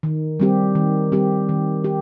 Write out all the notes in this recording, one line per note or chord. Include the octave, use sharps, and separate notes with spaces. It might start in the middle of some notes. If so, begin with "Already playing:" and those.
D#3
G3 C4 G4
D#3
G3 C4 G4
D#3
G4